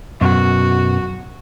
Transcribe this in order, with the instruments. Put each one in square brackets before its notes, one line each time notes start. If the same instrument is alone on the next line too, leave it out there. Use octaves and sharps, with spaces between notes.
[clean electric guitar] F#2 B2 [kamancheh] F#4